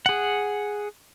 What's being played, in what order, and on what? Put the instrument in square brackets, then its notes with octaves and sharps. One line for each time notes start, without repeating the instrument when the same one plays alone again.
[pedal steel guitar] G#4 F#5